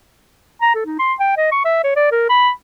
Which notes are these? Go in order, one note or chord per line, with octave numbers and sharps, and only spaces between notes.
A#5
A4
D#4
C6
G5
D#5
C#6
E5
C#5
D5
A#4
B5